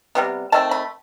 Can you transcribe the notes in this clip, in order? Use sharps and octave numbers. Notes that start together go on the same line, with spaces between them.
C3 E3 G3 B3
D#3 A3 C4 A5
B5